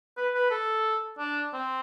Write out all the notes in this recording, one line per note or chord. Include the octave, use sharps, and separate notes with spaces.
B4
B4
A4
D4
C4